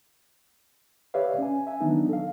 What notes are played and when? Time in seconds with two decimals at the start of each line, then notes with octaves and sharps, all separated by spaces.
1.14 G4 B4 C#5 D5 E5 F5
1.38 C#4 G#5
1.67 E5 G#5
1.80 D#3 E3 F#3 B3 D4 D#4
2.09 A4 F5